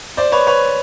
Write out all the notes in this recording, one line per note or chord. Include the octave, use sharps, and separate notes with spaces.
C5 D5
B4 C#5
B4 C#5